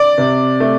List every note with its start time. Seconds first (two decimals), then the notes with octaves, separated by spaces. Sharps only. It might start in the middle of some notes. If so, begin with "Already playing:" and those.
Already playing: D5
0.18 C3
0.60 A3